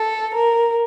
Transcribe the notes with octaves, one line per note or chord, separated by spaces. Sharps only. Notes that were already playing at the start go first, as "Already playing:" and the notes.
Already playing: A4
A#4